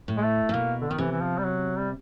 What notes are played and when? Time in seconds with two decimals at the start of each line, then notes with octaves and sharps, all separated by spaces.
0.08 A2
0.17 G#3
0.23 A3
0.49 A#2
0.53 B2 A#3
0.81 D3
0.90 B2 D#3
0.98 C3 E3
1.11 E3
1.21 F3
1.38 G3
1.44 F#3
1.78 G3